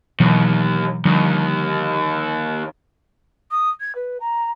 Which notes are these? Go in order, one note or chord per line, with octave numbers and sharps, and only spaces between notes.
D#2 B2 E3 F#3
D#2 D3 F3 G3
D#6
G#6
B4
A#5